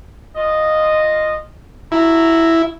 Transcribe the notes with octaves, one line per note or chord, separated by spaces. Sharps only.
F4 D#5
E4 F#4 A#5